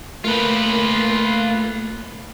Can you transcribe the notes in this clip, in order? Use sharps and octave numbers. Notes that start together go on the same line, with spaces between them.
A3 A#3 F4 B4